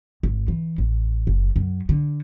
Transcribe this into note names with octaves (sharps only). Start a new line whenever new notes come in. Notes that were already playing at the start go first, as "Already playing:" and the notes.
G#1
E3
A1
F#1
F#2
D3